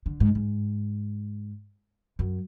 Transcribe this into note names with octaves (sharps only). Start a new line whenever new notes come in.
D3
G#2
G#2
F#2